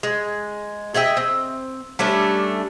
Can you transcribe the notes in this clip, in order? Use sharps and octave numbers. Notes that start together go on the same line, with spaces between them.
G#3
G#4 D#5 E5 G5
C4
G3 A3 C#4 D4